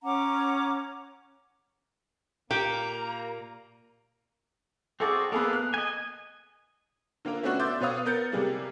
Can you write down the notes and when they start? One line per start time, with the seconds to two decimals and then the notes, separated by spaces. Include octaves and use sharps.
0.03 C#4 F#5 A#5 D6
2.51 A#2 A#3 G4 A#5
5.00 C4 F#4 G#4 A4 D5
5.32 A#3 B3 G#4 A4
5.53 F#6
5.74 D#5 G#5
7.25 D3 A#3 F4 A#4
7.43 A3 B3 C#4 D4 F#4
7.59 E5 C6 D6 G6 A6
7.81 B2 B4 C#5 F5 D#6
8.05 B3 A#4 G6 A6 C#7
8.32 C3 G3 G#3 A#3